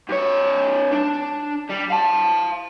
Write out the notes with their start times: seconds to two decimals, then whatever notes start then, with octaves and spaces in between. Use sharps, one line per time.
0.09 G2 C#5
0.92 D4
1.70 G3
1.91 F5 A5